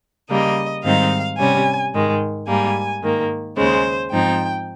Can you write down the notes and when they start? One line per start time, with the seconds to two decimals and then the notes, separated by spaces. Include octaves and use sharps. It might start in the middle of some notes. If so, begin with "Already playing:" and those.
0.30 C#3 G3 A#3 D#5
0.84 G#2 D#3 G3 C4 D#4 F5
1.38 C3 G3 C#4 G#5
1.93 G#2 D#3 G#3
2.47 G#2 G3 A#3 G#5
3.02 G#2 D#3 A#3
3.57 D#2 C#3 G#3 C5
4.11 G#2 F3 C4 D#4 G5